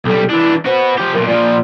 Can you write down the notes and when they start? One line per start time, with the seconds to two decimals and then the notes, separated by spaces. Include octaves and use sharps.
0.05 B1 G3 A4
0.30 E3 D4 E4
0.66 F#4 B4 C5
0.98 F3 G4
1.14 B1 A#2 A#4
1.28 A#2 F3 D5